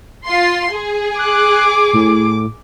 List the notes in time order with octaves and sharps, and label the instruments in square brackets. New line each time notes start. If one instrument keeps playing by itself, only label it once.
[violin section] F4 C6
G#4
[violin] D6 [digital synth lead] F#6
[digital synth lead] A2